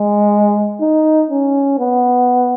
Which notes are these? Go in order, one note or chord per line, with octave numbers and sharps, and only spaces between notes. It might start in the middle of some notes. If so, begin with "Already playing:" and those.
Already playing: G#3
D#4
C#4
B3